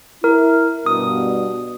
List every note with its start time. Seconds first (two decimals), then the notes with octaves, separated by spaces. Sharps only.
0.24 E4 A#4
0.86 G2 B2 D#6